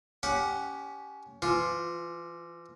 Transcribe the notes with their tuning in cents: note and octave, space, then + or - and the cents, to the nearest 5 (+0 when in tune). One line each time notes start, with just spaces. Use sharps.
C#4 +25 G4 +0 F#5 +0
E3 +35 F4 +0